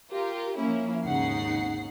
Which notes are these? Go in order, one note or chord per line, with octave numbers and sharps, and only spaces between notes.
F4 G4 A#4
F3 A#3 C#4 E4
G#1 D#2 C#3 D#4 F#5 C7